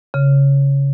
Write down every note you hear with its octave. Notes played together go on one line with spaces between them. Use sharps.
C#3